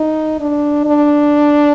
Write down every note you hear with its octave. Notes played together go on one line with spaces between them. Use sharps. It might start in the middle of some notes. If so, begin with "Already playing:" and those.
Already playing: D#4
D4
D4